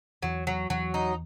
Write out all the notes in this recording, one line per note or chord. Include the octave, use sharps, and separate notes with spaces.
E2 E3 F#3
F#3
E2 E3 F#3
D#4